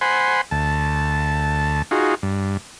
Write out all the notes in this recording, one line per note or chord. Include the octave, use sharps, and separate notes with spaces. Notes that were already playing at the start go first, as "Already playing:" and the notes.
C5 F#5 G#5 B5 C6
D2 A5
D#4 F4 F#4 G#4
G2